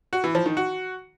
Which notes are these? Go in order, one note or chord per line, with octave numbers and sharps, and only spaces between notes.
F#4
E3
F3
D#3
F#4